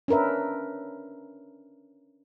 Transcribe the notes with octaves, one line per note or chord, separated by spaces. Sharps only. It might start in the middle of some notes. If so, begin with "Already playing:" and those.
C#4 D4 A#4 B4 E5